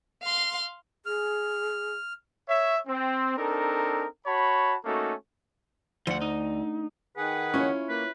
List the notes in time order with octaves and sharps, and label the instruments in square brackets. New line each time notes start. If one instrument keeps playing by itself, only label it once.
[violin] F5 C6
[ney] G#4 [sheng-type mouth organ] F6
[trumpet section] C#5 E5
C4
C4 D4 D#4 A4 A#4
F#4 C#5 A5 B5
A3 A#3 C#4 D#4 F#4 A4
[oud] D2 [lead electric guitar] F3 F#5
[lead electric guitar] D#4
[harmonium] D#3 G#4 F#5 [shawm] B4
[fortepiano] C#4 [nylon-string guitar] E4 F4 C#5
[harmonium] A#3 [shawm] B4